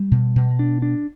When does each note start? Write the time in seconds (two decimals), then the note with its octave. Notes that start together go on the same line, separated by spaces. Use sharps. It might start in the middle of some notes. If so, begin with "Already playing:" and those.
Already playing: G3
0.11 B2
0.36 B2
0.59 D4
0.82 D4